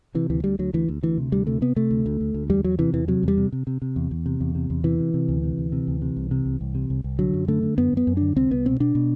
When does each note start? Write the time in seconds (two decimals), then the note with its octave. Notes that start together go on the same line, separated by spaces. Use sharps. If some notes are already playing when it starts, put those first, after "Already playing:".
0.15 C3 E3
0.30 D2 E3
0.44 D2 G3
0.59 D2 F#3
0.73 D2 E3
0.88 D2
1.03 D2 E3
1.18 C3
1.32 D2 G3
1.47 C3 A3
1.61 C3 B3
1.76 C3 A3
1.90 D2
2.06 D2
2.20 D2
2.34 D2
2.49 E2 G3
2.64 E2 F#3
2.79 C3 E3
2.93 E2 E3
3.08 C3 F#3
3.23 E2 G3
3.38 C3
3.52 C3
3.67 C3
3.82 C3
3.96 E2
4.11 E2
4.26 C3
4.41 E2
4.55 C3
4.70 E2
4.84 C3 E3
4.99 C3
5.14 C3
5.29 D2
5.43 C3
5.58 D2
5.72 C3
5.87 D2
6.02 C3
6.17 C2
6.31 C3
6.45 C2
6.61 C2
6.75 C3
6.90 C2
7.04 C2
7.19 D3 F#3
7.34 F#2
7.48 D3 A3
7.63 D3
7.78 F#2 B3
7.92 F#2 B3
8.07 F#2
8.17 D3 D4
8.36 C2 C4
8.51 C2 B3
8.66 B2 C4
8.80 B2 D4
8.95 B2